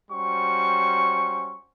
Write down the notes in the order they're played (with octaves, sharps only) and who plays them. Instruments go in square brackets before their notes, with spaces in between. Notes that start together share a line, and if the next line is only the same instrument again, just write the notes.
[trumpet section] G3 C#4 F#4 C5 C#6